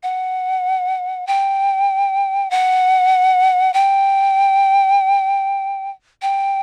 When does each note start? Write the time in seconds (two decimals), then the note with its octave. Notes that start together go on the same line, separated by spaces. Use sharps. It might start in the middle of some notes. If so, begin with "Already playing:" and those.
0.03 F#5
1.27 G5
2.51 F#5
3.74 G5
6.22 G5